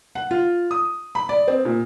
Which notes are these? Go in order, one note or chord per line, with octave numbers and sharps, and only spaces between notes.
F#5
F4
D#6
B5
D5
C4
A#2